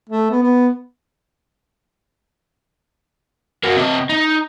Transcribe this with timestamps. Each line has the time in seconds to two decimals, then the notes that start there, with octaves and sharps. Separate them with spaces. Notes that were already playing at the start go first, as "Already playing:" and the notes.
0.09 A3
0.30 B3
0.43 B3
3.64 A#3 F#4
3.77 C3 D#5
4.09 D#4